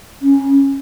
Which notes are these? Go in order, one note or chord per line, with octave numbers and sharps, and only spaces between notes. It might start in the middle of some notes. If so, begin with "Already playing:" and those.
C#4